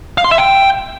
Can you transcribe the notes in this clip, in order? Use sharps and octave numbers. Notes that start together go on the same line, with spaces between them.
F5
C6
E5
G5